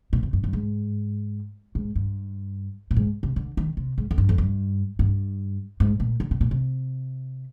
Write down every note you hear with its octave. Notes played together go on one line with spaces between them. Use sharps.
A#2
C3
G2
G2
G#2
G#2
G2
A#2
G#2
C3
D3
D#3
C3
G#2
F2
G2
F2
G2
G2
G#2
A#2
D3
C3
A#2
C3